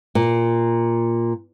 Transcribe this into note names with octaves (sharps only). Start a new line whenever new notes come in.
A#2